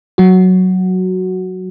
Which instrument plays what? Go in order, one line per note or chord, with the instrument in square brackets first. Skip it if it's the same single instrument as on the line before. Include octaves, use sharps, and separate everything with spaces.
[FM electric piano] F#3 F#4